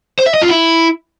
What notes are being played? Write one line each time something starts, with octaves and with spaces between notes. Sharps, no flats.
C5
E5
D#5
F4
E4